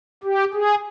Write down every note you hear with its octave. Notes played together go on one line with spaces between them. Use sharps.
G4
G#4